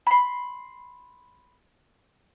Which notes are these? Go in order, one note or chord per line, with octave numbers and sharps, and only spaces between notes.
B5 C6